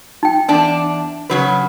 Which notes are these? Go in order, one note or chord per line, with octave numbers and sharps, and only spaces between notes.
D#4 G5
E2 D4 A5
C#3 F#3 B4